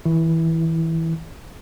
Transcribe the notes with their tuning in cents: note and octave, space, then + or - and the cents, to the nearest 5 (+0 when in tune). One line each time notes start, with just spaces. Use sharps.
E3 -25 E4 +0